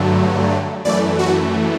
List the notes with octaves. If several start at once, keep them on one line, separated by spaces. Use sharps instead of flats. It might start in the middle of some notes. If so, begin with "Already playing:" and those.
Already playing: G2 D3 F#3 A3
F#2 E3 A3 D5
F#4